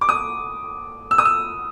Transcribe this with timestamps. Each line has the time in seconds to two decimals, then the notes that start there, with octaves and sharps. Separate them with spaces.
0.01 D6
0.09 D#6
1.11 E6
1.18 D#6
1.25 E6